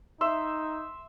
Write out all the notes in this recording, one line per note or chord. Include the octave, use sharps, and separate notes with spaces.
D#4 E5 C6 E6